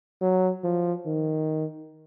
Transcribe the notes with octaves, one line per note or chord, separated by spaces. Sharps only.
F#3
F3
D#3